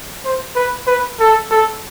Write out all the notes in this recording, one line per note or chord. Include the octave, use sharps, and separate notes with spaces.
C5
B4
B4
A4
A4